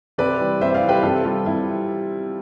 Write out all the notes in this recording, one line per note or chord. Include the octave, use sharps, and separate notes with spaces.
C3 B4 D5
E3 G3
C3 C5 E5
E5
D5 F5
E3
G3 G4 B4
C3 F4 A4
G3 F4
C3 E4